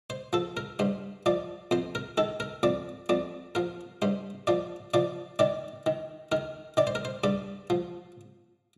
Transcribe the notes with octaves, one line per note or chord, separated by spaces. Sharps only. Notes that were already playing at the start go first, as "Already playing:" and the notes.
C5
F3 A4
A#4
G2 C5
F3 D5
F2 C5
A#4
D#3 A4
A#4
F2 D5
F2 D5
F3 A#4
G2 C5
F3 D5
F3 D5
D#3 D5
D#3
D#3 A#4
D#3 D5
C5
A#4
C5
G2 D5
F3